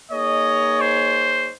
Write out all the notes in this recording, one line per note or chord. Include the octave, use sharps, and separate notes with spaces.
A#3 D#4 G#4 C#5 D#5
C5